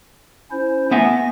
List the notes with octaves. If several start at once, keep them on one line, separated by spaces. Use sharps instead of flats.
C#4 E4 C5
A3 B3 E5 G#5 A#6